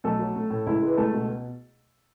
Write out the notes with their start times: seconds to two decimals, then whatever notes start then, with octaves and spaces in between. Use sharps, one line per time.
0.04 B1 A3 A4
0.19 F#3
0.36 A3
0.50 A2
0.66 C#2 E4
0.82 G#3 B4
0.97 C#2 A3 A4
1.13 B2